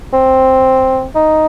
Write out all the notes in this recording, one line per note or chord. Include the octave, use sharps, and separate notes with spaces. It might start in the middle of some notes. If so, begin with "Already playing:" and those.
C4
D#4